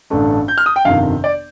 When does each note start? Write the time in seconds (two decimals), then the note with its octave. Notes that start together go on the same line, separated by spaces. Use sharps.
0.10 A1 G2 D3 A3 D4
0.48 G6
0.58 F6
0.66 D#6
0.76 G5
0.85 G1 F2 C3 D#3 F5
1.24 D5